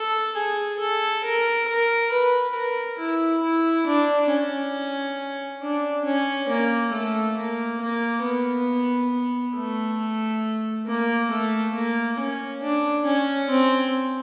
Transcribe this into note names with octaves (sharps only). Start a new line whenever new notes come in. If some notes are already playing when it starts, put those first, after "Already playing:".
Already playing: A4
G#4
A4
A#4
A#4
B4
A#4
E4
E4
D4
C#4
D4
C#4
A#3
A3
A#3
A#3
B3
A3
A#3
A3
A#3
C#4
D4
C#4
C4